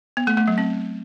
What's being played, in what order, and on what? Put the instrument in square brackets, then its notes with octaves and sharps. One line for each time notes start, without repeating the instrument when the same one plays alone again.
[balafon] B3
A3
A3
F#3
C4